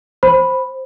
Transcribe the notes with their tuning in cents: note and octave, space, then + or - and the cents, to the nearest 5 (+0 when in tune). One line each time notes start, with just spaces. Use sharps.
C5 +0 B5 +0